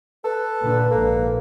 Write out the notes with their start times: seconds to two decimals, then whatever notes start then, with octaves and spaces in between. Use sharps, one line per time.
0.24 A4 B4
0.63 A#2 D3
0.91 A#1 G#2 A#3 A4